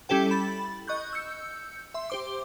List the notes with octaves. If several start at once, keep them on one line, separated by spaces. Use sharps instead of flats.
G3 C#4 E4 G4 A4 G5
B5 A6
D#5 C#6 F#6 G6
E6 G6 C#7
E5 C6
G4 C5 D6